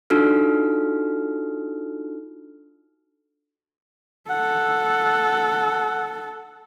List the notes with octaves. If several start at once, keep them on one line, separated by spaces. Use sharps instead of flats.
D4 D#4 F4 F#4 A4 F6
A4 F#5